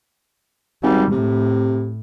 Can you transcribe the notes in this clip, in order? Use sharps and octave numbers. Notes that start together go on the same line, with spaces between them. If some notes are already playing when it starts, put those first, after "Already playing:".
G#1 G3
A2 C3